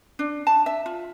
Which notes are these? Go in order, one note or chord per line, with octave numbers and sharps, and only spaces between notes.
D4
A5
E5
F4